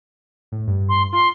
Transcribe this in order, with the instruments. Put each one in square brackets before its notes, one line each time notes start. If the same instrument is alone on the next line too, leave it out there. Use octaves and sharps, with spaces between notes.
[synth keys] A2
G2
[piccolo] C6
[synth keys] F4 [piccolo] C6